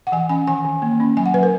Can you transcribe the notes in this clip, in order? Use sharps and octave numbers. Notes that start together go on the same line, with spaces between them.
F#5
E3 G#5
C#4 G#5
D#3 G#5
D#3
A#3
C#4
F#3 G#5
F#5
F#3 B4
A#4